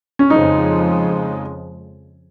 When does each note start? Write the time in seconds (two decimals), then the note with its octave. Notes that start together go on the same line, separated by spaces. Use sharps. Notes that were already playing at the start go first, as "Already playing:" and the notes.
0.19 C#4
0.30 F2 C#3 F3 G#3 D#4